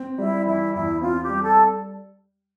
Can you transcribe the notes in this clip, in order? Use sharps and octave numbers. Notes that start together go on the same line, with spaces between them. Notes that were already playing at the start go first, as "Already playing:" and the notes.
Already playing: C4
G3 E4
E3 E4
E2 E4
C4 F4
G4
G3
A4